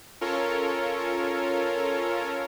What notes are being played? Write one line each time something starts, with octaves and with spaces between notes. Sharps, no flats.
C#4 F4 A4 A#4 C#5